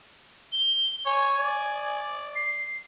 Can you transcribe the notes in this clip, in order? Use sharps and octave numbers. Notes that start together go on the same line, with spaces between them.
G7
C#5 G#5
D5
C7